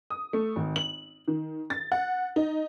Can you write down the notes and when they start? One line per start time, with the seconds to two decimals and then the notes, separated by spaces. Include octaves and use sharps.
0.10 D#6
0.33 A3
0.56 G#1
0.76 F#7
1.28 D#3
1.70 A6
1.92 F#5
2.36 D#4